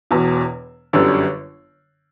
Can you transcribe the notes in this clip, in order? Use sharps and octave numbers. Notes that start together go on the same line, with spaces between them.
E1 E2 B2
G1 F#2 D3 G3